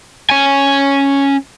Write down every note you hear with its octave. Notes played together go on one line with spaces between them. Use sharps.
C#4 G#5